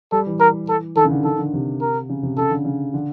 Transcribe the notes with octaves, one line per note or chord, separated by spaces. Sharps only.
G3 A4
E3
A#4
A4
D#3 A4
C#3
D3
D#3 A4
D3
C3
A#4
C#3
C3
C#3 A4
D3
C#3
D3